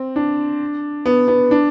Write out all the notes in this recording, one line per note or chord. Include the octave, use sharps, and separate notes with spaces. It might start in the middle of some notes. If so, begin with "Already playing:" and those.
Already playing: C4
D4
B3
B3
D4